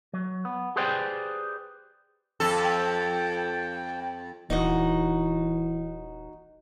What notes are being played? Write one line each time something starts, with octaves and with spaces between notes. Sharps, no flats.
F#3
B3
G4 G#4 B4 C5 D5 G5
F2 A4
G5
D#1 E3 D#4 F#4 D#5